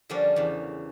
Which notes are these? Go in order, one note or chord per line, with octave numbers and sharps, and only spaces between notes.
D3 F3 G3 A#3 C#4 D4
E2 C#3